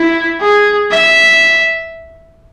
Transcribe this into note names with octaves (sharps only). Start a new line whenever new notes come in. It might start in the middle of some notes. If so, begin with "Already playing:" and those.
Already playing: E4
G#4
E5